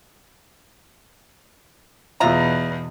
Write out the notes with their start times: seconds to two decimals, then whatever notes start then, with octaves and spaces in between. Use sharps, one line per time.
2.20 E2 B2 F4 E5 A#5